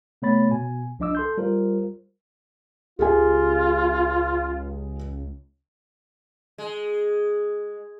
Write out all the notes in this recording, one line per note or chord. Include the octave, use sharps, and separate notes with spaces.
C3 A3 B3 C#5 B5 A6
B2 G#5
C2 F3 D4 D#5 D6 E6
A4 C6 G6
G3 F4 A#4 C5
C#2 F4 G4 G#4 G#5
G#3